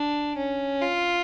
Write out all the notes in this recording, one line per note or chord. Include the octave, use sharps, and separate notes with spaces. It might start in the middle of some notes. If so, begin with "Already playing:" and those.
Already playing: D4
C#4
F4